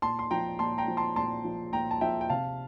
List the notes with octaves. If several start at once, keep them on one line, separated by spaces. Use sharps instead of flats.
A#2 A5 C6
C6
F3 G5 A#5
A#2 A5 C6
G5 A#5
F3
A5 C6
A#2 A5 C6
F3
A#2 G5 A#5
A5
F3 E5 G5
G5
C3 F5 A5